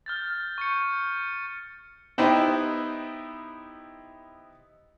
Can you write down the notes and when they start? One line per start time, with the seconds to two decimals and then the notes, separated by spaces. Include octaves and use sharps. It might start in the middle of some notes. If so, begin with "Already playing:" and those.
0.06 F6 G6 A6
0.58 C#6 G6 C#7
2.18 B3 D#4 E4 G4 C5 D#5